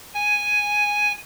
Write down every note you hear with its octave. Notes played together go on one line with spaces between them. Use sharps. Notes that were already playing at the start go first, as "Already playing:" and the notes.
G#5